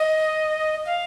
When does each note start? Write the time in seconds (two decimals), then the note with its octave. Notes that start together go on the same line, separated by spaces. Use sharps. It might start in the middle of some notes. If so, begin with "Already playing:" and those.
Already playing: D#5
0.86 F5